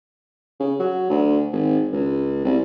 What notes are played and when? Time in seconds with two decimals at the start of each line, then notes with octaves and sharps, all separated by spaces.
0.60 C#3
0.79 F#3
1.10 D2
1.52 G#1
1.93 C#2
2.45 C2